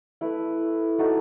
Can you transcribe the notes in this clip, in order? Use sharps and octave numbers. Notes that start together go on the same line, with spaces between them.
A3 E4 B4
A3 D#4 F#4 A4